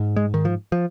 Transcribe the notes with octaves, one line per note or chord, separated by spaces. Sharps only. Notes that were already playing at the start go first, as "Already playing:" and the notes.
Already playing: G#2
G#3
D#3
F3
F3